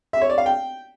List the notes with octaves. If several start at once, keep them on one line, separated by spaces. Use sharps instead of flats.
E5
C#5
D5
F5
G5